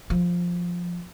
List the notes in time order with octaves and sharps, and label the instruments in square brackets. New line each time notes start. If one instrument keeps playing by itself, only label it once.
[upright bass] F3